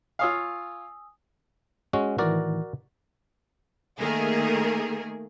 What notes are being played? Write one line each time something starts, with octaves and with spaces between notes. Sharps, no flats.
F4 C#5 F5 G#5 D#6 E6
G#3 C#4 F#4
A2 D#3 E3 F#4 A#4 D5
D#3 A3 A#3 G#4 A#4